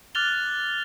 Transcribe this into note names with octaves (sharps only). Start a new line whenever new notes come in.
D6 F6 F#6 A6 F7 G7